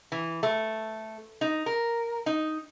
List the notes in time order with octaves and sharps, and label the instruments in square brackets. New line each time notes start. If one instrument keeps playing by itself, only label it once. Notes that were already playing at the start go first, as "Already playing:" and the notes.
[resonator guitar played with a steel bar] E3
A3
D#4
A#4
D#4